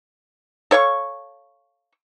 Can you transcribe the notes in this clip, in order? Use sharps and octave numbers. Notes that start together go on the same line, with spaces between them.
A4 C#5 F5 C#6